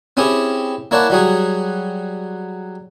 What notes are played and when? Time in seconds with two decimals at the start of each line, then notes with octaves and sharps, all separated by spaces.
0.17 C4 C#4 E4 G4 G#4
0.91 A#3 E4 C#5 D5 F#5 A5
1.10 F#3 G3 F#4 G#4